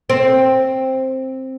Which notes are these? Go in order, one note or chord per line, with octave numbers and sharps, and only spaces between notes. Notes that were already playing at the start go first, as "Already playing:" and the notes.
C4